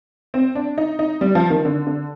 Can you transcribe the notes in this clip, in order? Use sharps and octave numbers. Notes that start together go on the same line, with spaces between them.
C4
D4
D#4
D#4
G3
F3
D#3
D3
D3